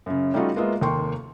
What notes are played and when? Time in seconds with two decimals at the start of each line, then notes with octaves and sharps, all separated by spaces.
0.06 F#2 C#3
0.34 G3 A3 C#4 D#4 F4 F#4
0.56 G#3 A#3 B3 F4 D#5 E5
0.81 F1 D#2 A#3 G5 C6 C#6